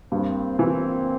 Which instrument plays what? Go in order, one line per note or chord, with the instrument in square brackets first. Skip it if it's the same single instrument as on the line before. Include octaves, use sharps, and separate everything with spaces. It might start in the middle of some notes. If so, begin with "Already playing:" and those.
[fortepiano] G2 [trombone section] A#3 C4
[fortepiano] E3